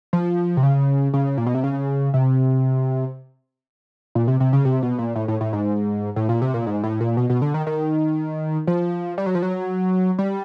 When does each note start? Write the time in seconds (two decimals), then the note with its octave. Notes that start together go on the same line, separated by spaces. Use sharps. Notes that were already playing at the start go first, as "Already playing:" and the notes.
0.13 F3
0.57 C3
0.63 C#3
1.14 C#3
1.37 A#2
1.46 B2
1.55 C3
1.64 C#3
2.14 C3
4.15 A#2
4.28 C3
4.40 C3
4.53 C#3
4.65 C3
4.83 B2
4.99 A#2
5.16 A2
5.28 A2
5.41 A2
5.53 G#2
6.16 A2
6.29 A#2
6.42 C3
6.54 A#2
6.66 G#2
6.84 A2
7.00 A#2
7.17 B2
7.30 B2
7.42 D3
7.54 D#3
7.67 D#3
8.67 F3
9.18 G3
9.26 F#3
9.35 F3
9.43 F#3
10.19 G3